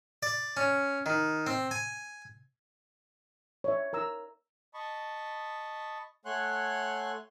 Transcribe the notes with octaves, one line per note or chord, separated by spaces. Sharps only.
D5
C#4
D#3
C4
G#5
C#5 D5 E5
A#4 A#5 E6
D#5 A5 B5 C#6
A3 C#5 F#5 G#5 C6 F#6